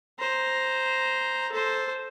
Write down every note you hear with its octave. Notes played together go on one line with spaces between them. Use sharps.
C5 A#5
A4 C5